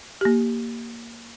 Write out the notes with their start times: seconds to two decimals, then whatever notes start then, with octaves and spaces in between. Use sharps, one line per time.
0.21 A#3 G4